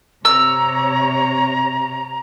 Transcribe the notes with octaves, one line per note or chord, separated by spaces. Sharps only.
C3 C#5 A#5 E6